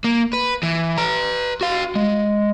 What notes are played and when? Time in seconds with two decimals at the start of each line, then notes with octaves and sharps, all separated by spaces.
0.04 A#3
0.33 B4
0.63 E3
0.98 B4 A#5
1.61 F#4 F5
1.95 G#3